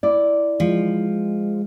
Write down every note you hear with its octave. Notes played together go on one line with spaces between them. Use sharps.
E4 D5
F3 G#3